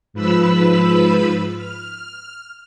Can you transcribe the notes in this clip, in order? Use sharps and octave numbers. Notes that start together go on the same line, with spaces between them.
G#2 F3 B4 B5 E6
F6